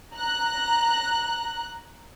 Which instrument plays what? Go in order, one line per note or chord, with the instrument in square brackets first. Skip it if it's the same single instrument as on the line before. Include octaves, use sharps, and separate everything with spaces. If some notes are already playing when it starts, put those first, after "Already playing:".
[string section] A#5 F#6